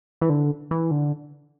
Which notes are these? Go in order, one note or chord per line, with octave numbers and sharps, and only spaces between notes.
E3
D3
E3
D3